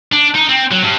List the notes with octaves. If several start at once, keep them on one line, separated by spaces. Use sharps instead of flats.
D4
D#4
C4
F#3
G2